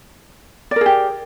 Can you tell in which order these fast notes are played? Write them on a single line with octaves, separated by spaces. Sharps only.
D5 A#4 G#4 G4